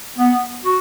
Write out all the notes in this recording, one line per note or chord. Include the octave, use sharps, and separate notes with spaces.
B3
F#4